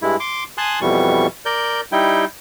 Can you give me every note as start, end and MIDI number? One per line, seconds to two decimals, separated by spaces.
0.02 0.16 43
0.02 0.16 56
0.02 0.16 64
0.20 0.44 84
0.20 0.44 86
0.58 0.79 80
0.58 0.79 81
0.58 0.79 84
0.58 0.79 87
0.58 0.79 90
0.82 1.27 41
0.82 1.27 47
0.82 1.27 52
0.82 1.27 55
0.82 1.27 85
1.45 1.81 70
1.45 1.81 74
1.45 1.81 91
1.92 2.25 55
1.92 2.25 63
1.92 2.25 64
1.92 2.25 79